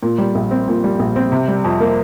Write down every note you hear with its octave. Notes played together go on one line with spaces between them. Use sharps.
A#2
G3
A#1
C4
A#2
G3
A#1
C4
C3
G3
F2
A#3